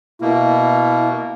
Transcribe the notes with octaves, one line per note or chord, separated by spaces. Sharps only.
B2 A#3 E4